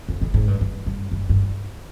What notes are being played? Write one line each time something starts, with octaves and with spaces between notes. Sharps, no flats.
F2
G#2
G#2
G2
G2
G2
G2
G2